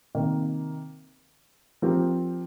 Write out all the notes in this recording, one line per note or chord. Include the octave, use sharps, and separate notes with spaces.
C3 D#3 A#3
F3 C4 G4 A#4